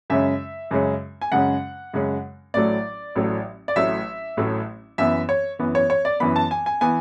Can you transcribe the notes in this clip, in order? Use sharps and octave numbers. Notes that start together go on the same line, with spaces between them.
F#2 C#3 G#3 C#4 E5
F#2 C#3 G#3 C#4
G#5
F#2 C#3 G#3 C#4 F#5
F#2 C#3 G#3 C#4
A1 A2 F#3 A3 D5
A1 A2 F#3 A3
D5
A1 A2 F#3 A3 E5
A1 A2 F#3 A3
F#2 E3 B3 E5
C#5
F#2 E3 B3
C#5
C#5
D5
F#2 E3 B3 B5
A5
G#5
G#5
E3 B3 G#5